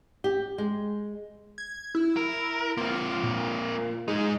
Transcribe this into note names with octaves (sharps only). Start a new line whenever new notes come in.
G4
G#3
G#6
E4
A#4
A#3 C4 F4
A#2
G#2 G#3 D#4